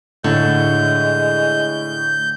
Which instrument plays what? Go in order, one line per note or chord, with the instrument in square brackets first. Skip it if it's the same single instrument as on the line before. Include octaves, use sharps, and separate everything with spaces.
[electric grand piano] A2 [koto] D3 [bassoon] G#3 [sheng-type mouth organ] G6